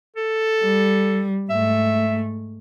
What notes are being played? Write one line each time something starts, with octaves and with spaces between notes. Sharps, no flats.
A4
G3
G#2 A3 E5